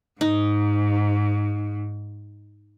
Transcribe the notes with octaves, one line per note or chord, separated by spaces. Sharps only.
G#2 D#4